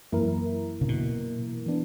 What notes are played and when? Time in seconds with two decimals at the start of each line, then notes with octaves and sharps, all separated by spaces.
0.12 F#2 E3 A#3 E4 A#4
0.81 C#3
0.88 B2
1.66 E3 B3 D4